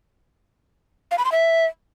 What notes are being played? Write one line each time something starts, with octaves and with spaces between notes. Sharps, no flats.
F5
B5
C6
E5